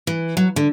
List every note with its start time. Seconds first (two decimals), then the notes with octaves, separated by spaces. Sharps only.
0.07 E3
0.37 F#3
0.56 D3